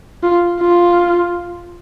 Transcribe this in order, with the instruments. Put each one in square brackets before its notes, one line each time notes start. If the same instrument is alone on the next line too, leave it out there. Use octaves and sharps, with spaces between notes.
[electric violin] F4
F4